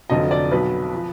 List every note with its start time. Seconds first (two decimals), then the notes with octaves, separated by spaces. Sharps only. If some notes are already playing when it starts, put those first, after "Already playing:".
0.10 F1 F2 D3 F#3 D#5
0.31 D5
0.51 B1 B2 F#3 B4
0.94 F3